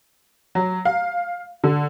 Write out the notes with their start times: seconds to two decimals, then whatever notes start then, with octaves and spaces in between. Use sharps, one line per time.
0.55 F#3
0.85 F5
1.64 D3